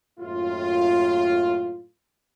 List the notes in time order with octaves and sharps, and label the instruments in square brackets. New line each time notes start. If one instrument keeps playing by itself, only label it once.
[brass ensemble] F#2 A2 D#3 A#3 F4